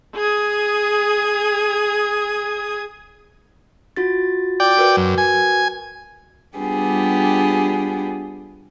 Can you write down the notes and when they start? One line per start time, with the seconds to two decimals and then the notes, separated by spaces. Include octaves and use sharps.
0.15 G#4 D#6 G#6
3.96 F4 F#4 A6
4.60 D5 G5
4.77 F#4 A#4 B4
4.97 F#2
5.18 G#5
6.57 G3 B3 D4 F4 G4 G#4